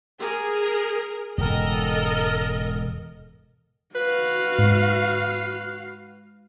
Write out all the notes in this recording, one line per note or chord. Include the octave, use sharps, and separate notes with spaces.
G#4 A#4
E1 G#2 C#3 A4 A#4 D#5
F#4 B4 F5
G#2